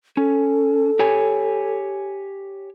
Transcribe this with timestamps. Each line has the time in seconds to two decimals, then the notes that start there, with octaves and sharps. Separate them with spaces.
0.17 C#4 A4
0.99 G4 C#5 G#5